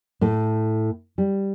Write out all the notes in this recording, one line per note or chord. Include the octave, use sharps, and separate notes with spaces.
A2 A3
G3